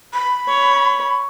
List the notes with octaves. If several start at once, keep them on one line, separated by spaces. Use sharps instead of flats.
B5
C#5